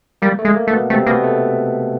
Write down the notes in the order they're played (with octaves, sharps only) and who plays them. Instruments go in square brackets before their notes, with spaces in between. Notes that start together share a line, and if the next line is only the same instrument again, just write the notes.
[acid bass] G3 [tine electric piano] A#3
[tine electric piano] A3
[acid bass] G#3
[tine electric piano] A#3
[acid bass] A3
[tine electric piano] B2 B3
[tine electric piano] C3 C4 [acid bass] A3
[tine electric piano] B2 B3 [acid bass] A#3
[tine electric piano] A3